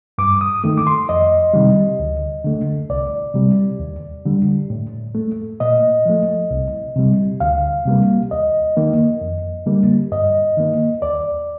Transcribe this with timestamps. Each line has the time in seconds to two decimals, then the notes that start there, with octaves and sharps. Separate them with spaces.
0.18 G2 D6
0.41 D#6
0.64 D#3 A3
0.78 D6
0.87 C6
1.09 F2 D#5
1.53 C3 D#3 G3
1.99 D2
2.44 D3 A3
2.90 C2 D5
3.34 C3 G3
3.79 D#2
4.25 D3 G3
4.70 A2
5.15 A3
5.60 A#2 D#5
6.05 F3 A3
6.51 C2
6.96 C3 G3
7.40 D2 F5
7.85 C3 G3 A#3
8.31 D#2 D#5
8.77 D#3 A#3
9.21 F2
9.66 D3 G3 A#3
10.12 G2 D#5
10.57 D#3 A#3
11.02 D#2 D5